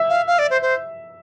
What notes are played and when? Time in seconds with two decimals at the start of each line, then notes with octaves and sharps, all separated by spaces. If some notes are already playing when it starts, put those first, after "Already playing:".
Already playing: E5
0.09 F5
0.27 F5
0.39 D5
0.50 C5
0.62 C5